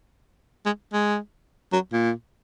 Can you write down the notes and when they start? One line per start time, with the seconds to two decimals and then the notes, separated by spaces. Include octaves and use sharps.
0.66 G#3
0.93 G#3
1.73 F#3
1.93 A#2